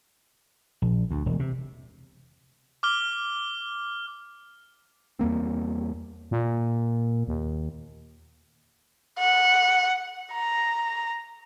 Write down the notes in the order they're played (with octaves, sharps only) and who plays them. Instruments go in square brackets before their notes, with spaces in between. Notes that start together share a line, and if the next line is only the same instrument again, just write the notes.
[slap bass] A#1
D2
E1
C3
[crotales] D6 F6 G7
[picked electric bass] E2 G3 A#3 C4
[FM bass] A#2
D#2
[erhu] F#5
A#5